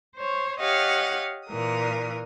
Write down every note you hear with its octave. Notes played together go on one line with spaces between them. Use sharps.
C5 C#5
G4 C#5 D#5 F5 F#5
A#2 E3 A#4 D#6